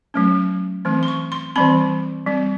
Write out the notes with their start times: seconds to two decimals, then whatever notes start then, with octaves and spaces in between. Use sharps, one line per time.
0.14 F#3 A3 C#4
0.85 E3 A3 C4
1.03 C6
1.08 C#6
1.32 C6
1.56 E3 G3 C4 B5
2.26 G3 C4